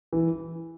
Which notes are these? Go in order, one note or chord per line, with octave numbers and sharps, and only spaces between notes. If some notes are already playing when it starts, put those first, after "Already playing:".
E3